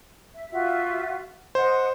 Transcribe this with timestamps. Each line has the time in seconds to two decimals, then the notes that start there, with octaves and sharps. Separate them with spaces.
0.34 E5
0.51 F4 F#4 E5
1.55 C5 D#5 F#5